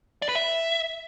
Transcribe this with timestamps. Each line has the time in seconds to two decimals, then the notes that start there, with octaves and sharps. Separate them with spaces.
0.22 D5
0.29 B4
0.35 E5